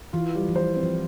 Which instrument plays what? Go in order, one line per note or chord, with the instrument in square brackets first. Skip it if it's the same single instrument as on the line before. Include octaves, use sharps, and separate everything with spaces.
[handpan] E3 [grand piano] F4
[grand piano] G3
[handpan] F3
[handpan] E3 [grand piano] C5
[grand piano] C4
[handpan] F3